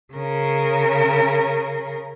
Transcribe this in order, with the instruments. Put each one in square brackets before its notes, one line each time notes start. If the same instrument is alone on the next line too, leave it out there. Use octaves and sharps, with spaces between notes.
[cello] C#3 A#4